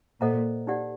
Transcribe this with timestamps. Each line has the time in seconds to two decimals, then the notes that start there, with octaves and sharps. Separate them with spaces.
0.21 A#2 A4 C5 D#5 F#5 A#5
0.67 D#4 G4 D5 F#5